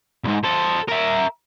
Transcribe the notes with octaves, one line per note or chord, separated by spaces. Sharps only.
C2 G#2
A4 C5
A#4 E5